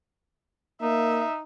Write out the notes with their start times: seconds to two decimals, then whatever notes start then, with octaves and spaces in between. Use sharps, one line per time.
0.82 A#3 D#4 E5